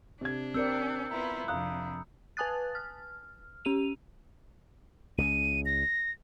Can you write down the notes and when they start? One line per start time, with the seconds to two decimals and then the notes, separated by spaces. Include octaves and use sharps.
0.21 C3 D4 G#6
0.54 C4 A#4 D5 E6 G6 C#7
1.11 B3 E4 F4 A#5 B5
1.48 F2 C3 D4 F5 A#5 D#6 F#6
2.37 B4 G#5 A5 D#6 F#6 A6
2.75 F6
3.65 C#4 G4 D#7 F7
5.18 C#2 C#3 D#7
5.66 A#6